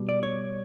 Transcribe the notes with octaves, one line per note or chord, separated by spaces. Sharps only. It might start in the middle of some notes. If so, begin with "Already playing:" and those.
Already playing: B2 G3
D5
C#5